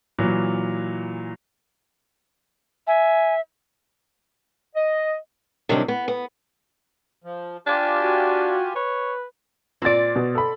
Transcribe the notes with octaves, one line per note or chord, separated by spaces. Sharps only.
A#2 E3 F#3
E5 G#5
D#5
C3 D#3 F#3 G3 C4 D4
B3
B3
F3
D4 F4 G4 G#5
F#4
B4 C#5
A#2 C4 D5 A6
B2
A4 B5